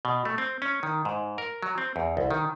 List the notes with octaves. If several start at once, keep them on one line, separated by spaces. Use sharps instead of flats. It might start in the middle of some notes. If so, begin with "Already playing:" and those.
B2
A3
C4
C#4
D#3
G#2
A#4
F#3
C4
E2
C2
D#3